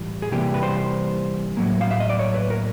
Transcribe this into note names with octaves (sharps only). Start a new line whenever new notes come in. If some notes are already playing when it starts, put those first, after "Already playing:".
Already playing: A2 E3 G3
G#4
C3 E3 G3 A#3 G4
B4
C5
A2 F#3 A#3
F5
E5
D#5
D5
C#5
B4
A#4